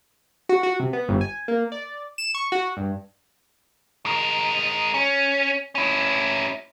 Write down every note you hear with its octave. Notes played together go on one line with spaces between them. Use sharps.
F#4
F#4
C3
B3
G1
G#5
A#3
D5
E7
C#6
F#4
G2
G#3 A#4
C#4
C#4 E4